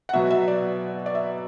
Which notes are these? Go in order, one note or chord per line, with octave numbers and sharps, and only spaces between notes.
F#5
B2 F#3 B3 E5
E5
D5
D5
E5